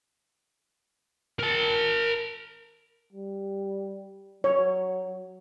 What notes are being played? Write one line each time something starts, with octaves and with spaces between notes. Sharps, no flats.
A#4 A5
G3
F#3 C#5